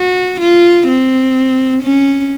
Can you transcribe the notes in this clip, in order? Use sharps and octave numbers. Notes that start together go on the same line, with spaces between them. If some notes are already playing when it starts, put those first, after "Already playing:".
Already playing: F#4
F4
C4
C#4